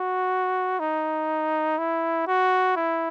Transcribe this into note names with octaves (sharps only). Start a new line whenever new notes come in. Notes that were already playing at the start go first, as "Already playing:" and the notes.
Already playing: F#4
D#4
E4
F#4
E4